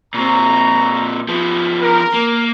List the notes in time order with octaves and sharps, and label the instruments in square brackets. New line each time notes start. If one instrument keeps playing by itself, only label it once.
[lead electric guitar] A#2 C4 [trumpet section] A#5 C#6
[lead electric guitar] F3 B3
[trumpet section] A#4
[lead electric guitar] A#3